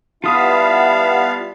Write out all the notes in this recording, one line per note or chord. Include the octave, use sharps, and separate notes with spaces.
G3 B3 E4 F4 F5 A5 B5 D#6